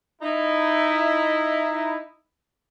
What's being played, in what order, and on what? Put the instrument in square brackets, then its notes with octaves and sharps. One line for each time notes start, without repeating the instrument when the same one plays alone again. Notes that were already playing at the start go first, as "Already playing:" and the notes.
[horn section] D#4 E4